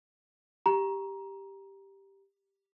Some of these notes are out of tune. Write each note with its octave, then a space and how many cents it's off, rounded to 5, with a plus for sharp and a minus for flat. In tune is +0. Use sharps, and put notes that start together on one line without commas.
G4 +0 A#5 +20